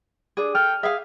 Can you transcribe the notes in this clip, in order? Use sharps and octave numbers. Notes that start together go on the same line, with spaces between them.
D4 G#4
A4 G5 F6
G#4 E5 F5